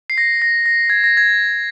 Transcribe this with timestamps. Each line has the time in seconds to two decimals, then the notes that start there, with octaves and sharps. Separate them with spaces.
0.10 C7
0.18 A#6
0.42 A#6
0.66 A#6
0.90 G#6
1.04 A#6
1.17 G#6